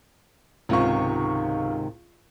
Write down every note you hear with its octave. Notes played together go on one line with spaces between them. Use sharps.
C#2 G#2 C3 D#3 F4 C#6